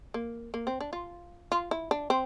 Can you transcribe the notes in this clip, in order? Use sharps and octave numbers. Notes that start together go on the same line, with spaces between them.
A#3
A#3
C4
D4
F4
F4
E4
D4
C4